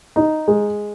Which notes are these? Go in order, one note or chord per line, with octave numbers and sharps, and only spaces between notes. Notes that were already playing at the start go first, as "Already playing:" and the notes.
D#4
G#3